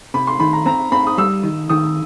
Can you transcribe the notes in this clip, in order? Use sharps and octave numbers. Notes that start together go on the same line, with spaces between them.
C3 B5
C6
D#3 B5
A#5
C4 A#5
C4 B5
D#6
G3 E6
D#3
D#3 D#6